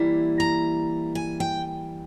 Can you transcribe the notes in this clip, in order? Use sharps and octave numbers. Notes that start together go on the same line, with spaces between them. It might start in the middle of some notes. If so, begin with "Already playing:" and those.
Already playing: E3 G3 A#3 E4
A#5
G#5
G5